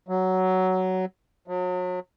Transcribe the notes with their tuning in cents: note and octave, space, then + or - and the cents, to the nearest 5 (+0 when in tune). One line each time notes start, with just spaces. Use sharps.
F#3 +10
F#3 -35